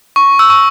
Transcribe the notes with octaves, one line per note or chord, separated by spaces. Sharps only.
C#6
E6
C#6